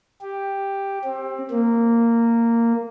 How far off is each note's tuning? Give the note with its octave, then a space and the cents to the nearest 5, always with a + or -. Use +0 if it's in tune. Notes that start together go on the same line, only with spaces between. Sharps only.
G4 +5
C4 +25
A#3 -10